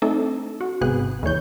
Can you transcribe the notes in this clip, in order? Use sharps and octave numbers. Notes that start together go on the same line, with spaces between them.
A3 C4 D4 D#4 A4
F#4
G#1 C3 B3 G#4 F#6
D#2 E3 C#5 G6